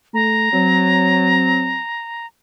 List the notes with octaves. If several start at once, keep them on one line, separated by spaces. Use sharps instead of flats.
A3 A#5
F#3 C4